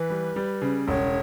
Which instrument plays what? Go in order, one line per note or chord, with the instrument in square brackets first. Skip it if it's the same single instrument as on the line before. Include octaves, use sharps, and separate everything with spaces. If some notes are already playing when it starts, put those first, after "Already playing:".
Already playing: [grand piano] E3 [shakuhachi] B4
[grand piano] G3
G3
C#3
[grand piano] E1 [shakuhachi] C#5